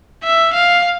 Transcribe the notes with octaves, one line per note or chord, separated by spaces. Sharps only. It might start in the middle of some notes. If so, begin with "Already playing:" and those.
E5
F5